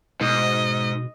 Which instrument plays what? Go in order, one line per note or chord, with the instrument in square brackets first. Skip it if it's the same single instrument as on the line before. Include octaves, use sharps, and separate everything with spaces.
[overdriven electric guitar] G#2 [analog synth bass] B2 [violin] D#5